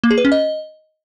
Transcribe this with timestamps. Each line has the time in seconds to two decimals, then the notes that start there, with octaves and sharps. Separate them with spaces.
0.04 A#3
0.11 G#4
0.18 B4
0.25 C#4
0.32 D#5